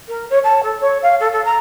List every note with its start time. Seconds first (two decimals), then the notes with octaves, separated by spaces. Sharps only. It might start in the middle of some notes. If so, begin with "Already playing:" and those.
0.08 A#4
0.30 C#5
0.44 A5
0.63 A4
0.80 C#5
1.02 F5
1.20 A4
1.32 A4
1.45 A#5